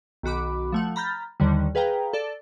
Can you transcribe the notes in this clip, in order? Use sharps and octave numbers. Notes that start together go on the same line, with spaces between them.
B1 D#3 F#4 B5 D6
F3 A3 F#5
A#5 B5 F6 G6 A6
D#2 D3 D#3 G3
G#4 B4 F5 G5 A#5
A4 D5